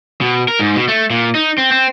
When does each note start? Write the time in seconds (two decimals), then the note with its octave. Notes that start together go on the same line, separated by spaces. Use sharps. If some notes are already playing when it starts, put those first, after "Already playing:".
0.21 B2
0.48 A#4
0.59 G#2
0.76 B2
0.88 A3
1.10 A#2
1.35 D#4
1.58 C4
1.72 C4